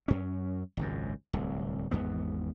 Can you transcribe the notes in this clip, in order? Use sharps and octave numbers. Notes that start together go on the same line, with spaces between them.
F#2 C#4
G#1 C#2 F#2
D1 C2
G#1 E2 G#2 B3